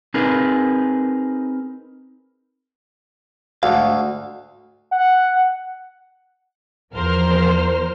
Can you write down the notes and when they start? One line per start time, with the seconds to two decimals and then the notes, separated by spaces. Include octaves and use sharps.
0.14 C4 D#4 G#4 A#4 B4
3.63 D2 G#2 F5
4.91 F#5
6.93 E2 F3 A#4 C5 F6